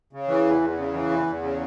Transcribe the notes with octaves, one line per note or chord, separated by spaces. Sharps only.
C#3
E3
E2
E2
C#3
E3
E2
E2
C#3